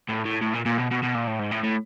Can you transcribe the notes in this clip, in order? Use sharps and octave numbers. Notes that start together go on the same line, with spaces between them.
A2
A2
A2
A#2
A#2
B2
B2
B2
A#2
A2
G#2
A2
A2